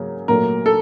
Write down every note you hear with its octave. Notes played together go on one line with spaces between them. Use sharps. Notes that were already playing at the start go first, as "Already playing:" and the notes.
Already playing: C#3 F#3 A#3
A#2 F#3 A3 A#4
A4